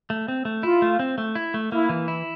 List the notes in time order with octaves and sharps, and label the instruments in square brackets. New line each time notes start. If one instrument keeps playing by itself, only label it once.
[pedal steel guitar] A3
C4
A3
[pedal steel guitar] E4 [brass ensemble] F4
[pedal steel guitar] A3
C4
A3
E4
A3
[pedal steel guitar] A#3 [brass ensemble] E4
[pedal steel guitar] E3
E4